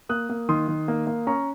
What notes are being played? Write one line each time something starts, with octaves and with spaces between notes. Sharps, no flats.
A#3 D#6 F#6
A#3
D#3 C6 D#6
D#3
A#3
A#3
C#4 A#5 C#6